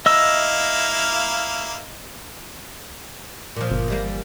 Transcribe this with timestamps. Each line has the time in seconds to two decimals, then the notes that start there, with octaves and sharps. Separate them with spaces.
0.06 A#3 E4 D#5 F5 E6
3.56 A#2 F3
3.71 G1
3.88 E2 G3 A#3